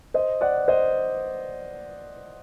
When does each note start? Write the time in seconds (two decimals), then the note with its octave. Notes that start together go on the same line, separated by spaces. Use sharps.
0.14 C5 D#5
0.41 D5 F#5
0.68 C5 D#5